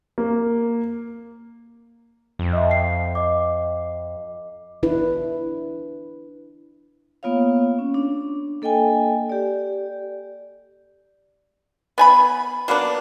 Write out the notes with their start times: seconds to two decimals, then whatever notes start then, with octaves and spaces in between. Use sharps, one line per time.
0.18 A#3
2.39 F2
2.53 D#5 E5
2.71 C7
3.15 D#5 D6
4.83 D4 E4 B4
7.23 A#3 B3 F4 C#5 F5
7.79 C#4
7.94 D4
8.62 A#3 A4 D#5 G5 G#5
9.30 G4 D5
11.98 B3 G#5 B5
12.68 F#3 A#3 B3 D4